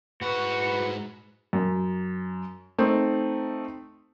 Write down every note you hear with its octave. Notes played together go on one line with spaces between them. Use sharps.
G#2 F#4 B4 F#5
F#2
A3 C4 D#4